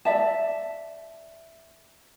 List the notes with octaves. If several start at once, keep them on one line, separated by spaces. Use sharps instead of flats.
D5 E5 A5